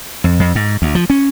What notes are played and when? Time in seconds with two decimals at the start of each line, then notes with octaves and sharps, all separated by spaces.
0.24 F2
0.40 F2
0.55 G#2
0.82 D2
0.95 F3
1.10 C#4